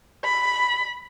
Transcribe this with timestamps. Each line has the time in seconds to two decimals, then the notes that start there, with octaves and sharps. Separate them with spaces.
0.24 B5